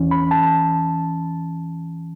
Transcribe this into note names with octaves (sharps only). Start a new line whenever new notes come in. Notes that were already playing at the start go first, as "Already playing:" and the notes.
Already playing: E2 E3 C#4
B5
A5